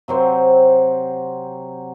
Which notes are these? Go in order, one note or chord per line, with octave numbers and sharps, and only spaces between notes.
C3 F#3 C4 C5